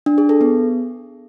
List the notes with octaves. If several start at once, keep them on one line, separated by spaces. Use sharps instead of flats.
D4
G#4
A4
B3